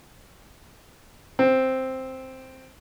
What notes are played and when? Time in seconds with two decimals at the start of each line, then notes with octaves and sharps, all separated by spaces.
1.39 C4